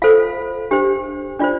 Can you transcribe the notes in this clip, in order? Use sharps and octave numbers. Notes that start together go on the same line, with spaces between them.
F4 A4 C5 F5
D4 G4 C5
D4 F4 C5 D5